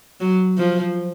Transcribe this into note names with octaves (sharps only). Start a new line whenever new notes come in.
F#3
F3